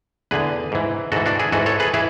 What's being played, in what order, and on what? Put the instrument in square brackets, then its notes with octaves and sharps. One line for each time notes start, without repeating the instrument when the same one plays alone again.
[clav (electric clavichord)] E2 D3 G#4 B4
G#2 E3
G#2 E3 F#4 A4
D4 F#4
E4 G#4
G#2 E3 F#4 A4
A4 C#5
G#4 B4
E3 E4 G#4